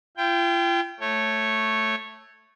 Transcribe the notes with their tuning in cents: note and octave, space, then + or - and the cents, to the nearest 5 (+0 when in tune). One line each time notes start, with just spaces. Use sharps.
F4 -40 G5 +0
A3 +0 C#5 -10